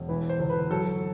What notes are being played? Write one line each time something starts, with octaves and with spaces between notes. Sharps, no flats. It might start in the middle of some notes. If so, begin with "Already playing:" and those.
Already playing: E1
E3 B4
C5
G1
B4
F#3 A4